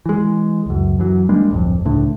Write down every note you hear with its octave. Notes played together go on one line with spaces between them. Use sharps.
E3 G#3
C#2 F#2
F#2 E3 F#3
G3 G#3 A#3 D4
D1 G1 F2
C#2 A2 D3